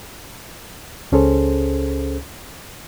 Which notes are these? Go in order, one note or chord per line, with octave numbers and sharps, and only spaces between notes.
C#2 C#4 G#4 A4 C5